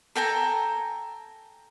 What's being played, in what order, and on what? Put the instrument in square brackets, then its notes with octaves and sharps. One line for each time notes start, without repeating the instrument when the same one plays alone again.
[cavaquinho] A4 G5 G#5 A#5